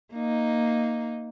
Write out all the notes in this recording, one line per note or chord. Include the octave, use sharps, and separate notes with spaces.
A#3 D#4